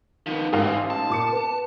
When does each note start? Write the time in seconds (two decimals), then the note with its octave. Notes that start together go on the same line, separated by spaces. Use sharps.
0.26 D#3 F3 B3
0.53 A1 G#2 E3 F5
0.90 A5
1.10 A#2 D6 C#7
1.33 B3